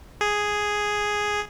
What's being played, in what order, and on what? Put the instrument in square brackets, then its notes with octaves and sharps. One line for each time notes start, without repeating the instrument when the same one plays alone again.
[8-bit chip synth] G#4